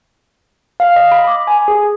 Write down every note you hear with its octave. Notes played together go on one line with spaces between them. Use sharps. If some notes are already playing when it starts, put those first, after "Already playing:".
F5
D#5
B5
D6
G#5
G#4